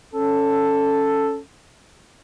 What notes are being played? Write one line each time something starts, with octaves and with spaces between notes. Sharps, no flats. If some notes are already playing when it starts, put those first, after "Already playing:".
C#4 A4